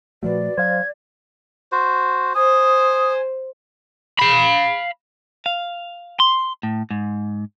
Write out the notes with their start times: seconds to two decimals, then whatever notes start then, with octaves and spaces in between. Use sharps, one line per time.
0.23 A#2 F3 A3 F#4 B4 D5
0.58 F#3 C5 F5 G#6
1.72 F#4 C5
2.35 C5 G#5 D#6
4.19 F5 B5
5.46 F5
6.20 C6
6.63 A2
6.91 G#2